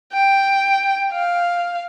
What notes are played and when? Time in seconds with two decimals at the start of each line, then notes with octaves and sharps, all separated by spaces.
0.13 G5
1.12 F5